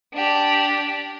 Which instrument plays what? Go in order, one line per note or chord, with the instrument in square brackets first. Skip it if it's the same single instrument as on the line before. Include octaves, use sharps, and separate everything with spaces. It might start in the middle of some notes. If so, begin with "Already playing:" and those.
[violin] D4 G4